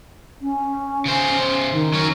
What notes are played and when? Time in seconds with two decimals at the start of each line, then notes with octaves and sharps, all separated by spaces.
0.42 C#4
1.06 C#3 C5
1.71 D#3
1.94 F#3 C#4